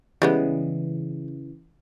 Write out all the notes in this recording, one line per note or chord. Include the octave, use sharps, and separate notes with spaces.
C#3 E3 G3 G#3 B3